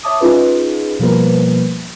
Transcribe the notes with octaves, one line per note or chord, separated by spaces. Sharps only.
C#5 E5 A5 D6 D#6
C#4 D#4 F4 G#4 B4
B2 F3 G3 A#3 A#4 B4